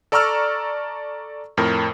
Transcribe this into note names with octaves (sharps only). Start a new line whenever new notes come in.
A4 D5 A#5 C#6 E6 F6
F2 A2 A#4